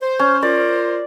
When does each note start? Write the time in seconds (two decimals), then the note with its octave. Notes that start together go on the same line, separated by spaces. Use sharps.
0.02 C5
0.19 C#4
0.42 F4 A#4 C5 D5